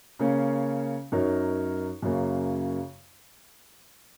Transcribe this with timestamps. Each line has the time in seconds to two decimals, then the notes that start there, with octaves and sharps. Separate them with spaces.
0.19 C#3 A#3 C#4
1.12 F#2 F#3 D#4 A#4 C#5
2.02 F#2 C#3 A#3